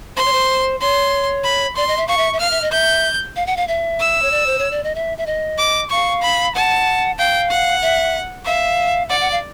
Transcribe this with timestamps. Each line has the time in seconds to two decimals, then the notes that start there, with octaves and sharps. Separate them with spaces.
0.16 C5 C6
0.25 C#5
0.33 C5
0.81 C#5 C6
1.44 B5
1.76 D5 C6
1.88 D#5
1.97 E5
2.08 F5 C#6
2.17 E5
2.33 E5
2.40 F5 F6
2.51 E5
2.62 D#5
2.72 E5 G6
3.36 F5
3.47 F#5
3.57 F5
3.68 E5
4.00 E6
4.22 C#5
4.31 D5
4.46 C5
4.59 C#5
4.71 D5
4.84 D#5
4.95 E5
5.18 E5
5.26 D#5
5.58 D6
5.90 F5 C#6
6.23 B5
6.54 F#5 A5
7.18 F5 G5
7.51 F#5
7.82 E5
8.45 E5 F5
9.09 D5 F#5
9.20 F#5
9.32 F5